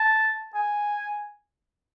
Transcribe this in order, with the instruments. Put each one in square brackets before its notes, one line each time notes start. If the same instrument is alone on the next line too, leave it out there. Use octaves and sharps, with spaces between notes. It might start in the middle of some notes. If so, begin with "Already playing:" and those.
Already playing: [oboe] A5
G#5